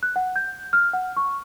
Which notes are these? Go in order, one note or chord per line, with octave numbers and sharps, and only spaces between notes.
F#6
F#5
G6
F6
F#5
C#6